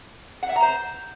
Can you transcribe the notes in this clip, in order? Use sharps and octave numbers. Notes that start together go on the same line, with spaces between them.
F#5
E5
A#5
C5